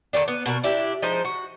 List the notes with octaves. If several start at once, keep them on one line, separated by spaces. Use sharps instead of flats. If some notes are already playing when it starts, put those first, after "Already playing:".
D3 D#3 G3 D4
B3
B2 F#4 A#4
D4 E4 G4
F3 G#3 D#4 C5
F#4